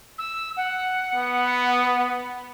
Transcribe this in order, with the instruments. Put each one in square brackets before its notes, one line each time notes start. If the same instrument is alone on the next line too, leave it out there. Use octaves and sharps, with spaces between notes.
[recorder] E6
F#5
[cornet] B3